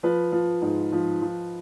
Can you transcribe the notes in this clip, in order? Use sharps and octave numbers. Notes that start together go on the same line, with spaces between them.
F3 B4
F3
G#2
F3
F3